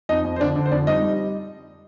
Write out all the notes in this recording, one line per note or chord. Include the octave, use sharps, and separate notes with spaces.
F2 D#4 D#5
F2
C5
D3 D4 D5
D3
C5
F2 D4 D5
G3 D#4 D#5
G3